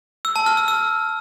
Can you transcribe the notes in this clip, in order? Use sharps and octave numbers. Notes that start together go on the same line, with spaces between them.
E6
A5
F6
E6
E6